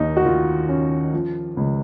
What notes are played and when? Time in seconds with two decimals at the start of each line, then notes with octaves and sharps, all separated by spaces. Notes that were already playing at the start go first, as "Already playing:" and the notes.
Already playing: D#2 A#3 D#4
0.17 F#4
0.25 D#3 F4
0.69 C#4
1.13 F3
1.57 C#2